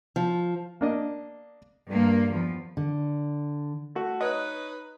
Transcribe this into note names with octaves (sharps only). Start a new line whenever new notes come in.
F3
A#3 D4 D#5
G2 A#3
E2 F3
D3
A3 F#4
D#4 B4 C#5 D#5